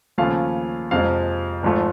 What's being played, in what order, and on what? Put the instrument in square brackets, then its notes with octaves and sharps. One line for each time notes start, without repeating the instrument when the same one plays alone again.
[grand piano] D#2 C#3 F3 A3 F5
F2 C3 F3 G#3 F5
G#1 G#2 F3 A3